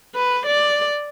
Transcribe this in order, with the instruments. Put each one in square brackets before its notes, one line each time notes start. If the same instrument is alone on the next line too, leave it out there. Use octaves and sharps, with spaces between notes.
[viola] B4
D5